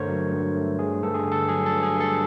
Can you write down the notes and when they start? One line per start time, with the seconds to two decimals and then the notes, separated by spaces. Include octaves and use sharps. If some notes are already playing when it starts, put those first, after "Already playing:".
Already playing: G2 D3 A3 A#4 C5 C#5
0.09 F#3
0.33 G2
0.56 A3
0.79 G2 G#4
1.03 G2 A4
1.14 G#4
1.26 D3
1.32 A4
1.48 F#3 G#4
1.66 A4
1.72 G2
1.83 G#4
1.95 G2
2.00 A4